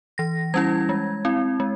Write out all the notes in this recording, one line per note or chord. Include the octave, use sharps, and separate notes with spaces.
E3 A#6
G3 C#4 E4 G#6
G#3
C4 E4
G#3